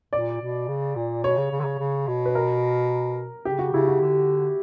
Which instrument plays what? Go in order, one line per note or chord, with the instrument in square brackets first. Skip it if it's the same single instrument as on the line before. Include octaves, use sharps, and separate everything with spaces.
[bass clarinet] A#2 [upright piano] D5
[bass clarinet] B2
C#3
A#2
[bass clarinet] B2 [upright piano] C#5
[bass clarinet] C#3
C#3
D3
C#3
C#3
B2
[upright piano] B4
A#4
[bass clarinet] C#3 [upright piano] G4
[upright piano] F#4
[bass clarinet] C#3 [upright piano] E4
[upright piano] F#4
[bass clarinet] D3